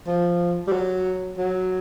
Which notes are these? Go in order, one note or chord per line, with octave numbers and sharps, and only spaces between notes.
F3
G3
F#3
F#3